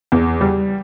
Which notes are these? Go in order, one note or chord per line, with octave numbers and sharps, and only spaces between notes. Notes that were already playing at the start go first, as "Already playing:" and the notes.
E2
G3